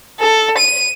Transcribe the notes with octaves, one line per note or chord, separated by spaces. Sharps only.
A4
D#7